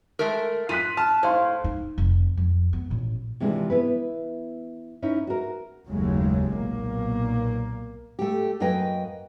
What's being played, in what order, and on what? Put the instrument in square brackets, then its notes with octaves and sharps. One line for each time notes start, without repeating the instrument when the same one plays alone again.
[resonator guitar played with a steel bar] G#3 A3 A#4
[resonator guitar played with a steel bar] F4 [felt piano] F#6 B6 D#7
[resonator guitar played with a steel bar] A5 [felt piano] F6
[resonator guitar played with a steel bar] A2 [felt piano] C5 F5 C6
[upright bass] D#4
F1
F2
B3
A1 A#2
[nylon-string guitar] C3 E3 F3 G#3 A#3 D4
B3 E4 B4
C#4 D#4 E4
F#4 A#4
[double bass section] F#1 D#2 C#3 F#3 G#3 A3
B1 A#2 A#3
[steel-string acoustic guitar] A3 G4
F#2 A#3 A#4 B4 D#5 G5